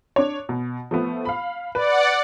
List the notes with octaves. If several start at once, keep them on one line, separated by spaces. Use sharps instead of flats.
D4 C#5
B2
F3 A3 B3
F5 B5
B4 D5 F#5